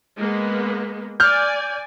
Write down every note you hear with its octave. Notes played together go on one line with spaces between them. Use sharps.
G#3 A#3 B3
D5 G#5 F6 G6